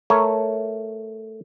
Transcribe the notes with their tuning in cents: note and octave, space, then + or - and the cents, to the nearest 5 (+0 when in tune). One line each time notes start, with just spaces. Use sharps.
A3 +0 A#4 +0 C#5 +0